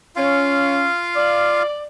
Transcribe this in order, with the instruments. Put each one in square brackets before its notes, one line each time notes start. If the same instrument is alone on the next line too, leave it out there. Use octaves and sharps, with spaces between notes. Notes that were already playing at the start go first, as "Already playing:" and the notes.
[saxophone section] C#4 [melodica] F4 F5
[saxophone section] D5